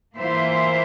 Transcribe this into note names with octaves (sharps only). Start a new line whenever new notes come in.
E3 A#3 F4 C5 E5